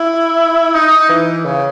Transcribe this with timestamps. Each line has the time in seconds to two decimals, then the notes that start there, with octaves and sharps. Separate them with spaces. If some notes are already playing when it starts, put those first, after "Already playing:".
Already playing: E4
0.75 D#4
1.09 E3
1.45 C#3